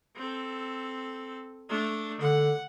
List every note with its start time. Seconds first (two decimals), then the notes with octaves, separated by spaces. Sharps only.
0.17 C4 A4
1.69 A3 D4
2.21 D3 F#5